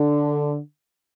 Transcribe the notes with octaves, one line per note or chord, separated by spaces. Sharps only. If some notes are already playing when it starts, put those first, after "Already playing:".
Already playing: D3